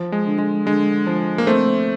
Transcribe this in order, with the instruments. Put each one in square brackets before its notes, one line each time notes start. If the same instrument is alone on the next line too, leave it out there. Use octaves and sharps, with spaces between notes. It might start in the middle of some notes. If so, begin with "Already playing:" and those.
Already playing: [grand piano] F3
[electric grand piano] G#3
[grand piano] D3
[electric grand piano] G#3
[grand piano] D3 [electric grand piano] G#3
[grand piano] F3
[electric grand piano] A#3
[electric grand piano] A3 [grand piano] C4